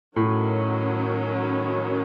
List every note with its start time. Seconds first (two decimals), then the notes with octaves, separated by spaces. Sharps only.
0.16 A2 D#3 F#3 C#4